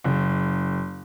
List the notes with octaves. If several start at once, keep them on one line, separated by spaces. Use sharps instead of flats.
F#1